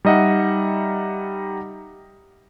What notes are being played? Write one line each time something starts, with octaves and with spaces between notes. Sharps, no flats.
G3 D#4 D#5 E5 F#5